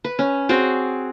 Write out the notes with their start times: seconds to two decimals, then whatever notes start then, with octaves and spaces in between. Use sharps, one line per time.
0.04 B4
0.19 C#4
0.49 C4 F#4 G#4